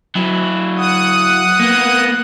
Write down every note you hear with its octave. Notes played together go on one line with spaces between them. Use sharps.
F#3 E4
F#5 D#6
A#3 B3